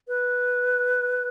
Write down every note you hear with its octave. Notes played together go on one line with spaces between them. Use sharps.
B4